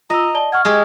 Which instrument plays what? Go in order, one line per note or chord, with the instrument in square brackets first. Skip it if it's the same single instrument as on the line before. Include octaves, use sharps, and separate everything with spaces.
[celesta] F4 E6 [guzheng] D#5 [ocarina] A#5
[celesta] D5 A5 G7
[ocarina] F#5 [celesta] C#6 F6 G#6
[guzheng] G#3 G4 G#4 [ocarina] D#5